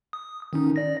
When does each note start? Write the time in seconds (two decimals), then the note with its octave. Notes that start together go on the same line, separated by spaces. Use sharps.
0.13 D#6
0.53 D#3 C#4 D#4
0.76 D5 A#6